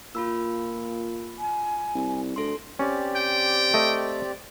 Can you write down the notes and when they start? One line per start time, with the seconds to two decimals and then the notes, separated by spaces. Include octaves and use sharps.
0.15 A#2 F4 B5 E6
1.39 G#5
1.95 C2
2.36 D2 A4 C6
2.79 C4 C#4 G4 D5
3.16 G5
3.74 A3 D#5